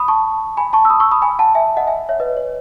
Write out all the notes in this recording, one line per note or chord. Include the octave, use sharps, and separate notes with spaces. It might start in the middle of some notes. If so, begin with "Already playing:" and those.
Already playing: B5 D#6
A5 C#6
G#5 B5
A5 C#6
E6
B5 D#6
C#6 E6
B5 D#6
G#5 B5
F#5 A5
E5 G#5
D#5 F#5
E5 G#5
C#5 E5
B4 D#5
C#5